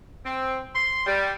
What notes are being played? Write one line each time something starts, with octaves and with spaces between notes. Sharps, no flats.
C4
C6
G3